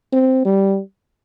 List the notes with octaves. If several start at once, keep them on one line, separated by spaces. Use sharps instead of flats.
C4
G3